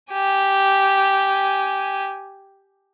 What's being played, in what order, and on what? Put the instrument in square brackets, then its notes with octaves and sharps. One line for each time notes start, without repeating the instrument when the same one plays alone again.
[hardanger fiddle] G4 G#5